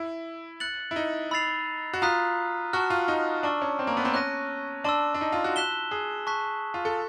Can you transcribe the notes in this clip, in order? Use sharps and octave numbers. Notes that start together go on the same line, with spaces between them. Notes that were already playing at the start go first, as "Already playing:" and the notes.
Already playing: E4
F#6 A6 C#7 F#7
E4
D#4
B5 E6 A6 C7 F7
F#4
F4 A#5 D#6 F#6 B6
F#4 A5 C#6 F6
F4
D#4
D4 A5 C#6 E6
C#4
C4
A#3
B3
C4
C#4 F#6 A#6 D#7
D4 A5 C6 E6
D4
D#4
F4
F#4
F#6 B6 E7 G7
G#4
A5 C#6 F#6 B6
F4
A4